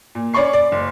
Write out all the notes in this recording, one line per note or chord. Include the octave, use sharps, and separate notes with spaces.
A#2
C#4 D5 B5 C#6 C7
D5
F#1